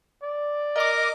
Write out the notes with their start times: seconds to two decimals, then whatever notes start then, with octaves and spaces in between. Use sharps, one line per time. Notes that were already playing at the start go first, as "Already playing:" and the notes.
0.23 D5
0.76 A#4 D#5 D6